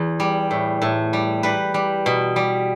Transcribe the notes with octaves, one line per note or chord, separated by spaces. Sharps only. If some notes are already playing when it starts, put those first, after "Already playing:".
Already playing: E2
G3
A2
A2
G3
G3 B4
G3
B2
G3